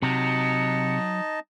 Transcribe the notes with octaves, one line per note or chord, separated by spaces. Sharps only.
C3 F#3 D#4 D#5 A5 C#7